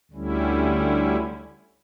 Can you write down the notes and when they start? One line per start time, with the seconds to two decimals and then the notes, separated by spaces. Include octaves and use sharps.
0.11 D2 D3 G3 C#4 E4